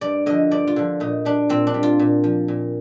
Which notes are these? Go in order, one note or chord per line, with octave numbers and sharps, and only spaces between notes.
G2 D5
D3 F3 D#5
G2 D5
F4
D3 F3
A#2 D#4
G3 D4
A#2 C4
D4
G3
F4
A#2
F3
A#2